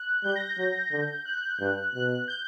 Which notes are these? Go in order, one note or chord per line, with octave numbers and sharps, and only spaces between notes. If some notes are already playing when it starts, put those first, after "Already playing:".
Already playing: F#6
G3 G6
A#6
G6
F#3
D3
F#6
G2
B2 F#6
G6